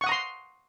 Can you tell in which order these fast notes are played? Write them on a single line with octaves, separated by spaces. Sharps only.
C#6 F#5 D#6 A#5 C6